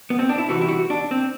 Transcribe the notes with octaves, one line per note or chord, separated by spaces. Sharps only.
B3
C4
D4
E4
C2 C3 E3 F#4
E4
F#4
D4
C4